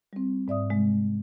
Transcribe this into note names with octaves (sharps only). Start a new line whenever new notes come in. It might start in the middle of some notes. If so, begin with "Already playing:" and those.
G3 C4
G#2 D5 E5 D#6
C3 G#3